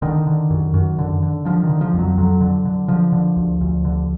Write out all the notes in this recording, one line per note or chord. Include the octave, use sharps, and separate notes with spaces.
D3 D#3
D3
F#2
F#2
D3
D3
D3 F3
D#3
D3
F3
F2 F#3
F2 F#3
D3
D3
D3 F3
D3
D2
D2
D3